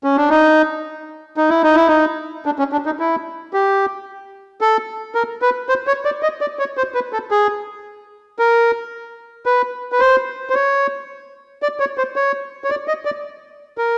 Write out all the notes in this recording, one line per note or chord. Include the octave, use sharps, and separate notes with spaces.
C#4
D4
D#4
D#4
E4
D#4
E4
D#4
D4
C#4
D4
D#4
E4
G4
A4
A#4
B4
C5
C#5
D5
D#5
D5
C#5
C5
B4
A4
G#4
A#4
B4
B4
C5
C5
C#5
D5
C#5
C5
C#5
C#5
D5
D#5
D5
A#4